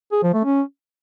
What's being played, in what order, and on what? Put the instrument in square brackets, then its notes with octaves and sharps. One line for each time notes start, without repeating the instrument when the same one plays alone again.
[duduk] G#4
F3
A3
C#4